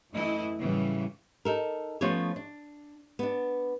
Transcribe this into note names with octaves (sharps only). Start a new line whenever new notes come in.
F#2 E3 A3 E4 D#5
A2 C#3 E3 F#3 G3
D#4 A4 A#4
F3 A3 B3 C#4 B4 C#5
D4
B3 D4